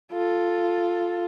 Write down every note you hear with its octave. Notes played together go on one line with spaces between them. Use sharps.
F4 A4